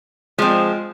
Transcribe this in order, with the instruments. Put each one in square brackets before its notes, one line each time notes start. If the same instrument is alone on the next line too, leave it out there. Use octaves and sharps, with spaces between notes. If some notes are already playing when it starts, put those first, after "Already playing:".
[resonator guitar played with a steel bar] F3 C4 [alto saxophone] G#3